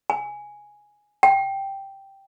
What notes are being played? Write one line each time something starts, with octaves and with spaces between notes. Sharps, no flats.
G#5
G5